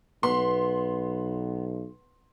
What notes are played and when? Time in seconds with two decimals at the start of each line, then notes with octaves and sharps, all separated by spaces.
0.23 B1 B3 C6